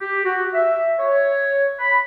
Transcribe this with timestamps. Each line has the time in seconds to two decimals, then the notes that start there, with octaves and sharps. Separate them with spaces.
0.01 G4
0.26 F#4
0.54 E5
1.00 C#5
1.80 B5